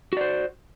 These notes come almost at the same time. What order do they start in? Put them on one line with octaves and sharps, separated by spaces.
F#4 D5 C5